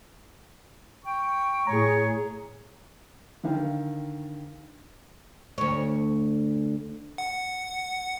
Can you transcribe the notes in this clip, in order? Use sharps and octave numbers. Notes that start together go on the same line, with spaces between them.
G5 C#6
A2 G#4 C#5 A#5
D3 D#3 F5 G5
D2 C#5
F#5